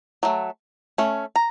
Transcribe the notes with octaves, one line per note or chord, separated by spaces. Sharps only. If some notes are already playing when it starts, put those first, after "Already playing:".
F#3 A3
A3 C#4
A#5